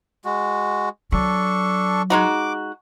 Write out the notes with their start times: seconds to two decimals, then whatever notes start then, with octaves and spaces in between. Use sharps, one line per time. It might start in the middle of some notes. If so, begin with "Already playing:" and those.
0.25 G#3 F#4
1.12 F#3 D4 A4 C#6
2.10 G#3 D#4 F#4 D6